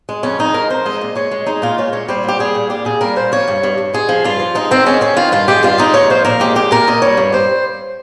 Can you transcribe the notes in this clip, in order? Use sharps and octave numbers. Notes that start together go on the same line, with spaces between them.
G#3
F2 C#4
G#3 D#4
F2 A#4
F2 C5
G#3 D#5
A#2
G#3 C#5
G#3
G#3 D#4
A#2 F4
G#3 C#5
A#2 C#5
G3 C5
A#2 G4
G3 G#4
A#2
G3 G4
A#2 G#4
G3 A#4
A#2 C5
F3 C#5
G2
G2
G2
G#3 G#4
F3
G2 F4
F3
G#3 D#4
D#3 C4
G#3 C#4
D#3 C#4
D#3 F4
G2 F4
G#3 G4
G2 F4
G#3 D#4
A#2 C#5
F3 C5
A#2 A#4
G#3 G4
A#2 G4
A#2 A#4
A#2 D#5
G3 C#5
G2
G3 C5